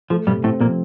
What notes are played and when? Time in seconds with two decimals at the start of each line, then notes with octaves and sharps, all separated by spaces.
0.10 F3 A3
0.27 G2 C3 G3
0.43 A2 A3 C4
0.60 A#2 F3 A#3